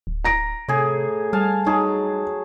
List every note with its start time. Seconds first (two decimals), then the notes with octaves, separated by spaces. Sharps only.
0.07 D1
0.24 A#5 A#6 D7
0.68 A2 C3 G#4
1.33 G3 F5 G#5 A5
1.66 F#3 D#4 G#4 A5